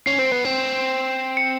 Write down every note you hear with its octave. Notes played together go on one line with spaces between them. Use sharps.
C#4 C7
C4
B3
C4
C#7